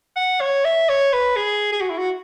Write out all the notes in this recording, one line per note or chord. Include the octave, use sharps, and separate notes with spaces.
F#5
C#5
E5
C#5
B4
G#4
G#4
F#4
E4
F#4